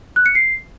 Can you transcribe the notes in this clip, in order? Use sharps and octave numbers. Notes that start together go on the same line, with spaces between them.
F#6
C#7
C7